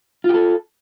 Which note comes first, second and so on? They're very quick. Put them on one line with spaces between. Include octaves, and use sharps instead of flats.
F4 G4 A4